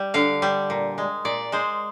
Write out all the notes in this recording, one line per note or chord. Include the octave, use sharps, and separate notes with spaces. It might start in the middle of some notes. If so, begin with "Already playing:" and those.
Already playing: G3
D3 F5
G3
A#2
G#3
A#2 D5
G#3 C5